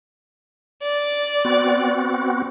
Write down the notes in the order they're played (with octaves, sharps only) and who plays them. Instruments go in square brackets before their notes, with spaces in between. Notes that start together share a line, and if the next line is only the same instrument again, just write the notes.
[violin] D5
[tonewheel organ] B3 C4 F#4